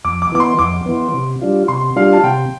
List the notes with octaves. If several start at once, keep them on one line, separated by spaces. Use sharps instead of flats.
F2 D6
D6
E3 B3 D6
C6
F2 D6
E3 B3
C3
G3 D4 F4
C3 C6
G3 D4 F4 F5
A5
C3 G5